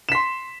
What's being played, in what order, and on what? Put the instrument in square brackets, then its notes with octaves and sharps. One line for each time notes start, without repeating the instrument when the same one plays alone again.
[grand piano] E7
B6
C6